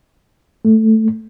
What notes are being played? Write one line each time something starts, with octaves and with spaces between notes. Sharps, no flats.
A3